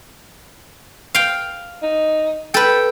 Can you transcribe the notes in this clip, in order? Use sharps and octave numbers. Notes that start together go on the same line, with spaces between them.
F5 G5
D#4
A4 B4 G5